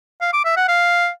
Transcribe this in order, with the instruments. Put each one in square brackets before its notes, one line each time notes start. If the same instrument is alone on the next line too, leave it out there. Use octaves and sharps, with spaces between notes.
[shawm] F5
D6
E5
F#5
F5